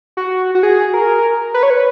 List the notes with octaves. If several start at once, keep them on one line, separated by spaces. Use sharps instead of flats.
F#4
F#4
G#4
A#4
B4
C#5
B4